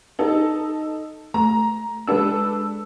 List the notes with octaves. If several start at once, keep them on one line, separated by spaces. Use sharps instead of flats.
D#4 A4
A3 A#5
G#3 D4 A4 B4 E6